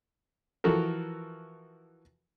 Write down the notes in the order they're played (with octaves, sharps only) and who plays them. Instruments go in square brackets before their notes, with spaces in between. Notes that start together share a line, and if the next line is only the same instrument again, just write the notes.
[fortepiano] E3 F3 F#4 A4 A#4